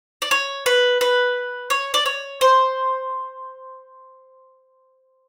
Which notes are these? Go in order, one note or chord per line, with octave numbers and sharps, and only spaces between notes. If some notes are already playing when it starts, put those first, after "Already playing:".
D5
C#5
B4
B4
C#5
D5
C#5
C5